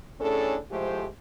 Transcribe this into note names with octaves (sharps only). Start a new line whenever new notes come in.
A2 C#4 D4 G#4 A4
A2 F3 G#3 A3 G4 C5